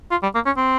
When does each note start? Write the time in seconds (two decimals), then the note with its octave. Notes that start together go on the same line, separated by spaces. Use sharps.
0.11 F4
0.23 G3
0.35 A#3
0.46 C#4
0.57 C4